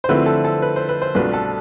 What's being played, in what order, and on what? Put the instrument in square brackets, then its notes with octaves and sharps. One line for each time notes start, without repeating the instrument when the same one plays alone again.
[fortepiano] C5
[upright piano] D3 F3 A3 C4 E4 [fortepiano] B4
[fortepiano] A4
A4
B4
C5
B4
C5
[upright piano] C2 B2 A3 D4 F4 [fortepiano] B4
[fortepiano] A4